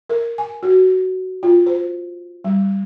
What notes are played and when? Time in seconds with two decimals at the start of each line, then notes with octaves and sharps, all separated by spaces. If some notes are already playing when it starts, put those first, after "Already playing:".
0.10 A#4
0.38 G#5
0.63 F#4
1.43 F4
1.66 C5
2.44 G3